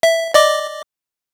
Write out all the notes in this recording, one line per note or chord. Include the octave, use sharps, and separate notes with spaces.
E5
D5 D#5 D6